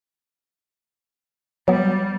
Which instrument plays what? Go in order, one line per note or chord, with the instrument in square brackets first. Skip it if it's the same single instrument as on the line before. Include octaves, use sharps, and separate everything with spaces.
[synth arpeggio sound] F#3 B3 [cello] G3